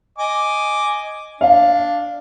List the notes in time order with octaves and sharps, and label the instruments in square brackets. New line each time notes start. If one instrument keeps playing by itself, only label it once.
[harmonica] D#5 G#5 D6
[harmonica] D4 [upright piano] F5